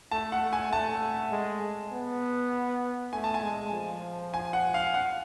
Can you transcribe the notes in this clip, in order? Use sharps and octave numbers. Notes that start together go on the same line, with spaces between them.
A3 A5
F#5
A3
G#5
A3 A5
G#3
B3
A3 G#5
A5
G#5
G#3
F3
G#5
F#5
F5
F#5